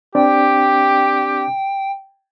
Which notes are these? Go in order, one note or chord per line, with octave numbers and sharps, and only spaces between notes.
C4 D4 G4 D5 G5